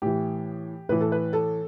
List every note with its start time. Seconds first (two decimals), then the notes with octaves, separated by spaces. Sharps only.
0.02 A2 E3 G4
0.89 A2 E3 B4
1.01 A4
1.12 B4
1.33 A4